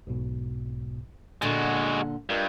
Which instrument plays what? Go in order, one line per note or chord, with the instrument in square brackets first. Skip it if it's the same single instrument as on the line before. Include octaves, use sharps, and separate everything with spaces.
[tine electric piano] B1 G#2 B2
[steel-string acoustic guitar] A#2 D3 [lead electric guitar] G#3 F#4 [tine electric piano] A6
[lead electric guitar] G2 [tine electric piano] F4 A#4 D#5